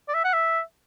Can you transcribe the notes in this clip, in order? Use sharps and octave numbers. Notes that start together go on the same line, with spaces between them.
D5
E5
F#5
E5